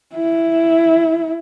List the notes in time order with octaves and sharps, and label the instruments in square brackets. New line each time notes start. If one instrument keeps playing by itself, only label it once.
[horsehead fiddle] E4